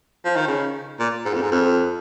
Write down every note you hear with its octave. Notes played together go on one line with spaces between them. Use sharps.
F3
D#3
C#3
A#2
G#2
F2
G#2
F2